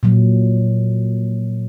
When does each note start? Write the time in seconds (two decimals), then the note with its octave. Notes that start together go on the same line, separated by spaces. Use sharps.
0.03 A#2 F#3